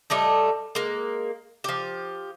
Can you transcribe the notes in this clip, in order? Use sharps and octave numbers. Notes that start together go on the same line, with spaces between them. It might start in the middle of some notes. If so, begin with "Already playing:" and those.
A2 G3 A3 D#5
G#3 A#3
F3 G4